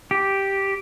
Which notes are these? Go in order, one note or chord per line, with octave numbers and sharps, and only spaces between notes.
G4